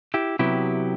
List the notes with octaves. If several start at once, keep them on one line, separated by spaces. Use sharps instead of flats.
E4 G4
C3 F#3 B3 E4 G4